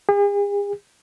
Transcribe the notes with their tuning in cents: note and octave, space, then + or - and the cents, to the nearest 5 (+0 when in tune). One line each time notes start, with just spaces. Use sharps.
G#4 -45